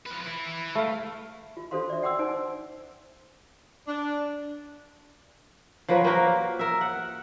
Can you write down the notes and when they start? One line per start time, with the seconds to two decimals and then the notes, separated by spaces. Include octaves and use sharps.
0.06 F3 B4
0.22 E4 B4
0.75 A3 F5
1.57 F4
1.71 D4 F#4 A4 C5 F5 C6
1.90 D5 E5
2.02 D5 F#5 G5 C6 D6 E6
2.19 D4 D#4 C5 G#5
3.87 D4
5.88 F3 F#3 A#3 B4
6.04 A#3 F#4 G4 A#4
6.59 A#4 E5
6.81 F#5